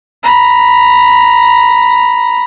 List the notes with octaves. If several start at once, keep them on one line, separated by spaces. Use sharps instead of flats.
A#5 B5